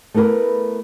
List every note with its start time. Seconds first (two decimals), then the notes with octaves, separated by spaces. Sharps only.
0.14 A3 B3 E4 A#4 B4